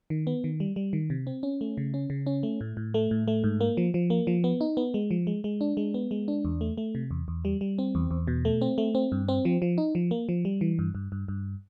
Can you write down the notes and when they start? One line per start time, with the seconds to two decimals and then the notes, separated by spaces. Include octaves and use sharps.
0.10 D#3
0.27 B3
0.44 D#3
0.60 G3
0.76 G3
0.93 D#3
1.10 C3
1.27 C4
1.43 C#4
1.61 A3
1.77 C#3
1.94 C#4
2.10 C#3
2.26 C#4
2.43 A3
2.61 A2
2.77 A2
2.94 A3
3.11 A2
3.28 A3
3.44 G#2
3.61 A#3
3.77 F3
3.94 F3
4.10 A#3
4.27 F3
4.44 B3
4.61 D#4
4.77 B3
4.94 G#3
5.11 F3
5.27 G#3
5.44 G#3
5.61 D4
5.77 G#3
5.94 B3
6.11 G#3
6.28 D4
6.45 E2
6.61 A3
6.78 A3
6.95 C3
7.11 E2
7.28 E2
7.45 G3
7.61 G3
7.79 C4
7.95 E2
8.11 E2
8.27 B2
8.45 A3
8.62 C4
8.78 A3
8.95 C4
9.12 G2
9.28 C4
9.45 F3
9.62 F3
9.78 D#4
9.95 F3
10.11 A#3
10.29 F3
10.45 G3
10.61 E3
10.79 G2
10.95 G2
11.12 G2
11.28 G2